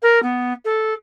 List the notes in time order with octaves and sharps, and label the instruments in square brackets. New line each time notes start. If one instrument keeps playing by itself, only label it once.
[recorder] A#4
B3
A4